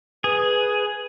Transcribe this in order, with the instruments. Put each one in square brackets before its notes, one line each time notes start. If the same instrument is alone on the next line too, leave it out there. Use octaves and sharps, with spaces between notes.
[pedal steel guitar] G#4 [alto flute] B4